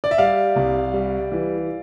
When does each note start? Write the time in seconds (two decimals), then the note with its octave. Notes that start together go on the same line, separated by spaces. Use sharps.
0.04 D5
0.11 E5
0.18 G3 D5 F5
0.56 C2
0.94 G3
1.32 E3